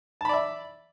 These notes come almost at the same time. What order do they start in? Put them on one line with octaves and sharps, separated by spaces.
A5 B5 D5 E5